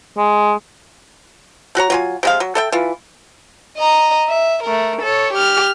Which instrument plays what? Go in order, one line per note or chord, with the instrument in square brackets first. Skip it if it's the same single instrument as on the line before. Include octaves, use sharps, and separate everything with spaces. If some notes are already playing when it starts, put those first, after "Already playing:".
[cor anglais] G#3
[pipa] A3 F#4 C#5 A#5
F#3 F4 G#5
C3 G#3 F5
F#3
A4 E5 G5
E3 F4
[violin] D#5 A#5
E5
A3 A#4
A4 C#5
G4 F6